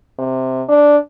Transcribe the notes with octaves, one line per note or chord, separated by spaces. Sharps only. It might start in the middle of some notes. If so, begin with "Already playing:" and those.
C3
D4